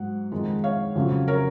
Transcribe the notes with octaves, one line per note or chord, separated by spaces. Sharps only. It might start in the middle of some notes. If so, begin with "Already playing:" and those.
Already playing: G#2 F#3 F#5
F2 D#3 G#3
C#5 F5
F2 C#3 F#3
A#4 C#5